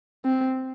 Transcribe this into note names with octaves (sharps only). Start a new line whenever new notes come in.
C4